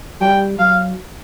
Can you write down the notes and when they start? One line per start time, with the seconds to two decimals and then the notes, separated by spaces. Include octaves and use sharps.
0.21 G3 G5
0.59 F#3 F5